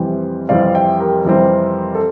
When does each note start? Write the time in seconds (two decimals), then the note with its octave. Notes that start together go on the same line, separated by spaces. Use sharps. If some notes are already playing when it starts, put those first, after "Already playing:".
Already playing: F2 C3 E3 G3 C4 G5
0.49 F2 C3 E3 G3 C4 D5 F5
0.75 E5 G5
1.00 G4 A#4
1.25 F2 C3 E3 G3 C4
1.95 A4